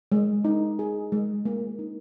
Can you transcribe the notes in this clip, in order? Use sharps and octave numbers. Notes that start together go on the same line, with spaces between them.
G#3
D#4
G#4
G#3
A#3
D#4